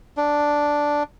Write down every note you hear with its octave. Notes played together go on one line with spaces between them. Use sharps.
D4